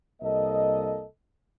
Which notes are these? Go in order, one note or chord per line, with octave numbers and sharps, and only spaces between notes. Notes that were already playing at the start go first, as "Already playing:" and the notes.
C2 A#3 A4 D#5